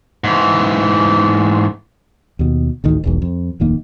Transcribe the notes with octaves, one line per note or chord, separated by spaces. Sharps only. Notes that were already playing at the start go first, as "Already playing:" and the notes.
G#2 E3
D#2 B2
A1 D2 D#3
E1 B1 E2
F2
D1 F2 D#3 A#3